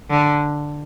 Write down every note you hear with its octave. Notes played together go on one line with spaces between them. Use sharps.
D3